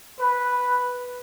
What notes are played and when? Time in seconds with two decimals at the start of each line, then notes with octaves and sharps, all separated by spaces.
0.20 B4